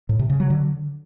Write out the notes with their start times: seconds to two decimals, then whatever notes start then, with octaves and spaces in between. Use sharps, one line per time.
0.09 A2
0.19 C3
0.30 C#3
0.40 F#3
0.50 D3